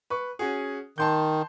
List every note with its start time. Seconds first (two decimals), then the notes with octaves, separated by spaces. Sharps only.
0.10 B4 C#6
0.39 C#4 F#4 G#4
0.98 D#3 A5 C6 G6